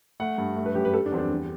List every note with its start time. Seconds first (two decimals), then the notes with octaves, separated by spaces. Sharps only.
0.20 A3 F#5
0.38 G2
0.57 A3
0.66 B4
0.75 F#2 G4
0.85 B4
0.94 G3 A4
1.06 D4
1.12 E2 C4
1.18 D4
1.30 G3